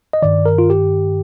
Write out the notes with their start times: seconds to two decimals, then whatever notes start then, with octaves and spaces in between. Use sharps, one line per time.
0.13 D#5
0.22 G2 D#3 D5
0.46 A#4
0.58 F4
0.70 G4